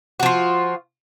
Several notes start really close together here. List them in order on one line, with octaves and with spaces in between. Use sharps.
F#4 F3 F4